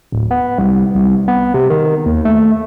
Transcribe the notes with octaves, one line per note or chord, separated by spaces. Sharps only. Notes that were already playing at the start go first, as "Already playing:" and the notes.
D1
B3
C2
C2
B3
C3
D#3
D#2
A3